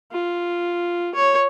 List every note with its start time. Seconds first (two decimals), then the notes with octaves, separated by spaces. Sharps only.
0.12 F4
1.15 C#5